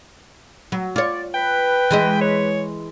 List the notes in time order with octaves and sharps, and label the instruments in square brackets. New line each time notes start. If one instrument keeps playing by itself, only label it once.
[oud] F#3
[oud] F4 C#5 [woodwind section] D5
[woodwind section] B4 [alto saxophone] G5
[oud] E3 G#3 D#5
[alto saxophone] C#5